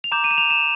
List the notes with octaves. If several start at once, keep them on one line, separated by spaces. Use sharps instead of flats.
F7
A#5 D6 G6 E7
D#7
E7
F7
E7